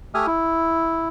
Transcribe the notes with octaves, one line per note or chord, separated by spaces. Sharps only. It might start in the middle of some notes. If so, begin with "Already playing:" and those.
A3 G4 E5 G#5 D#6 F6
E4